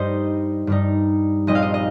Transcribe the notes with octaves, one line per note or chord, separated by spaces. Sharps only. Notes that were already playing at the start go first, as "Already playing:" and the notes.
Already playing: G2 G3 D#4 C5 D#5
G2 G3 D#4
A#1 A#2 G3 C4 D#4 D#5
F5
D#5
D#5